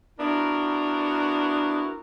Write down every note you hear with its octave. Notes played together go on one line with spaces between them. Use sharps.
B3 D4 E4 F#4 A#4